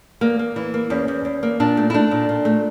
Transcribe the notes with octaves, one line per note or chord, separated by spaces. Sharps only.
E2 A#3
A#3
E3
A#3
E2 C#4
E2
E2
A#3
A#2 D4
A3
E4
A3 D4
A#2
A#2
A3